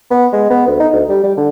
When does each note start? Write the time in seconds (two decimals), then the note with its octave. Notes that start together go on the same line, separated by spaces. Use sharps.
0.11 B3
0.32 G#3
0.50 B3
0.67 D2
0.80 D#4
0.93 D2
1.09 G3
1.24 G3
1.37 D3